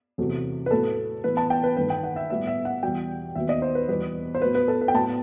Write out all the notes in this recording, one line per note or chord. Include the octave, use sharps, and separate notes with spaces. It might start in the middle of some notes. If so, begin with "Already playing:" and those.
E2 C3 F#3 A3
B4
A2 F#3 A3 A4
A2 E3 B3 B4
A5
G5
B4
G2 D#3 A3 B4
G5
F#5
E5
A2 G3 B3 E5
E5
F#5
E2 B2 G3 G5
D#2 D#3 F#3 B3 E5
D#5
C5
B4
E2 B2 G3 B3 B4
C5
A2 F#3 B3 B4
B4
A4
B4
G5
A2 F#3 B3 A5